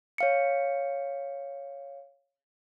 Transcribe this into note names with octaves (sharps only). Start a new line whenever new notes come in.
C#5 F5 C#7